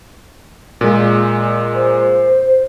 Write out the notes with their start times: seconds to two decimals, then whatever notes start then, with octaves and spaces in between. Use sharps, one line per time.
0.81 A#2 G#3
1.75 C5